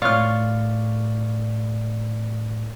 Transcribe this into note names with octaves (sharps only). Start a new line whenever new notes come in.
A2 F4 C#5 D5 F5 C#6 F6